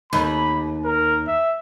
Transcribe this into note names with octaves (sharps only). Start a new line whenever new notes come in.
D#2 B5
A#4
E5